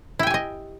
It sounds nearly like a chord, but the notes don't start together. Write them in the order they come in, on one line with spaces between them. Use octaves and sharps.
E4 G5 G#5 G4 D#5